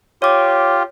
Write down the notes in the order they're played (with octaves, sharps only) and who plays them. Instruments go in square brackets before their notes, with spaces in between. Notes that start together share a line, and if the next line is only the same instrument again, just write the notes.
[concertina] F4 G4 [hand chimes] C#5 D6